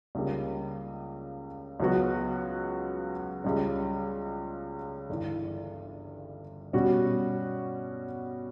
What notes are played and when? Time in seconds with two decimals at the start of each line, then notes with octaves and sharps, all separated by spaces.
0.15 C#2 C#3 G3 A#3
1.80 C#2 C#3 F#3 B3 F#4
3.44 C#2 C#3 G3 C#4
5.09 G1 G2 E3
6.73 B2 G3 C#4 F#4